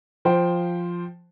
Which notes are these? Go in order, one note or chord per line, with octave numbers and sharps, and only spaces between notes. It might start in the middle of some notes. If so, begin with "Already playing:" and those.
F3 C5 G5